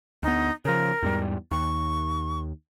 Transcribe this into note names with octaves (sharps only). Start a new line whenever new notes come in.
D2 B3 D#4
C#3 F3 A#4
E2 G#2 G3
D#2 C#6